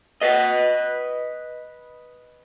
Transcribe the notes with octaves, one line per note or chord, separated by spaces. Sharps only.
B4 D#5